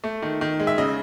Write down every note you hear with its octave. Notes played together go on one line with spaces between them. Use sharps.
A3
D#3
D#3
G#3
E5
C#3 D#5